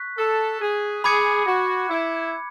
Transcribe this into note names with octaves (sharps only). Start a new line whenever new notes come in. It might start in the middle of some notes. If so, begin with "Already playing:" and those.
Already playing: C#6 F#6 B6
A4
G#4
G#4 B5 D6 G#6 C#7
F#4
E4